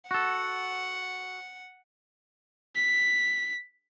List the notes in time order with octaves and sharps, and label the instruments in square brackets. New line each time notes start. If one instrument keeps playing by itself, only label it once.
[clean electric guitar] F#4 A4 [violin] F#5
[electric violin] B6